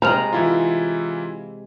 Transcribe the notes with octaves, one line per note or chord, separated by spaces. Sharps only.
C3 G#3 C5 A#5 F6 F7
E3 E4 F4